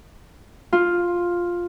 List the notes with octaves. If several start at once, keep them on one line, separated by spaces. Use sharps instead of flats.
F4